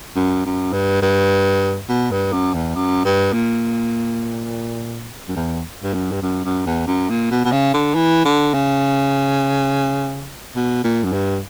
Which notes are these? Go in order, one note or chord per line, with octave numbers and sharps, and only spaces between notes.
F#2
F#2
G2
G2
B2
G2
F#2
E2
F#2
G2
A#2
F#2
E2
G2
F#2
G2
F#2
F#2
E2
F#2
A#2
B2
B2
C#3
D3
E3
D3
C#3
B2
A#2
F#2
G2